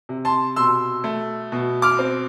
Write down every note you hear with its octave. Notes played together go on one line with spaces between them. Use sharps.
C3
A5 C6
B2 C6 E6
A3
B2
D6 F6
C4